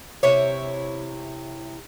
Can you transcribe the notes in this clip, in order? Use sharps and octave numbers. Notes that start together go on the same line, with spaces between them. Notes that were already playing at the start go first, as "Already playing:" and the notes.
C3 E4 C#5